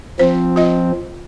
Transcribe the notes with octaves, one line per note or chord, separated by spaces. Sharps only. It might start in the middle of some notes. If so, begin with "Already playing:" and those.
F3 C4 C5
F4 D#5